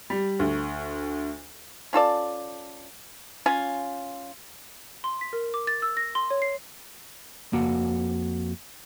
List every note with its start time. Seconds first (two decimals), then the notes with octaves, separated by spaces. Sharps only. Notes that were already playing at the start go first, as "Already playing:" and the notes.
0.10 G3
0.39 D2
1.93 C#4 F4 A4 D5
3.46 C#4 F4 G#5
5.04 C6
5.21 B6
5.33 A#4
5.54 D6
5.67 A6
5.82 E6
5.97 A#6
6.15 C6
6.30 C#5
6.42 C7
7.53 F2 A#3 F#4 F#5